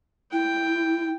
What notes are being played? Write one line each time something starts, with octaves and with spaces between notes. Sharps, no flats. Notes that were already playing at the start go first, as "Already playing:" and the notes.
E4 G5